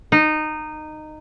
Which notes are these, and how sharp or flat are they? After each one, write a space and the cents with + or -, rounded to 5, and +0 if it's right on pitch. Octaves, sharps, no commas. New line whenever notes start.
D#4 -15